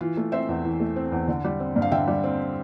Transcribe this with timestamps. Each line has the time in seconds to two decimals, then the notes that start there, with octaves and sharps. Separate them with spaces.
0.01 E3 F4
0.17 A3
0.32 C4 C5 E5
0.49 E2
0.65 E3
0.80 A3
0.96 C4
1.12 E2
1.28 D3
1.45 G3
1.60 C4
1.76 G2
1.82 F5
1.92 D3 E5 G5
2.08 G3
2.23 C4